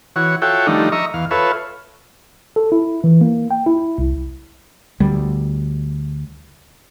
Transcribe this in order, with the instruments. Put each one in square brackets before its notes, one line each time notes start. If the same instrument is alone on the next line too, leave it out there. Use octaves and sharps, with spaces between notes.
[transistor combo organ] E3 F#4 C#5
F4 F#4 A4 C#5 E5 G5
D#3 F3 G3 A3 D4 D#4
D#5 E5 A#5 C#6
E2 F5
F4 A4 B4 C#5 E5
[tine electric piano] A4
E4
E3
A#3
G5
E4
C2
[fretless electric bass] D2 G3